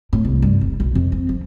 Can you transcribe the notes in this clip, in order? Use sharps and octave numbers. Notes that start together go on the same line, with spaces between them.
A2
C2
G2
F1
B1
F2
C4
F3